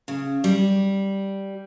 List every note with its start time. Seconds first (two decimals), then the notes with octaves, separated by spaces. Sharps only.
0.08 C#3
0.44 G3